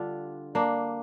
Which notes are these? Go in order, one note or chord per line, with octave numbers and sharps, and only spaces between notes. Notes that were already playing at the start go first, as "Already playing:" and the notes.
Already playing: D3 G3 D4 F4
A#3 D4